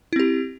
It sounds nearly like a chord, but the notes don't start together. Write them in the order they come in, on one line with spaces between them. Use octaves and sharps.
E4 C4 G4